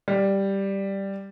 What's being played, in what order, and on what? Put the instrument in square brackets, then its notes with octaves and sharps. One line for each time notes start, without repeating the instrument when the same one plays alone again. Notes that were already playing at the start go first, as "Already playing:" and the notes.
[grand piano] G3